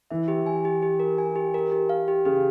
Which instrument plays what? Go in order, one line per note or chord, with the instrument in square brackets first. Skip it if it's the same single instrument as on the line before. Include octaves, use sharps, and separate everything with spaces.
[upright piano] E3 [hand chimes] E5
[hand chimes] G4
G#5
G4
G4
A#4
G#5
G4
A#4
G4
F5
G4
[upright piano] C#3 [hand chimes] G4